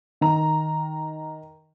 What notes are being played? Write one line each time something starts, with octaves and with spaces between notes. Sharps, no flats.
D#3 A#5